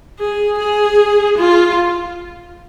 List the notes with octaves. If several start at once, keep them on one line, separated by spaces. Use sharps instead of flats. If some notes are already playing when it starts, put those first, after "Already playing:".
G#4
G#4
F4